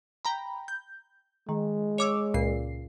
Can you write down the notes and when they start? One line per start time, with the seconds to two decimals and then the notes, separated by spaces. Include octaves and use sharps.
0.25 G5 A#5 B5
0.68 G6
1.49 D#3 G#3
1.98 C#5 D6 E6
2.34 C#2 A#2 C7